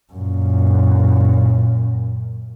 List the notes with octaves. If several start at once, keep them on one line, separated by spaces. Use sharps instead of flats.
F#2 A#2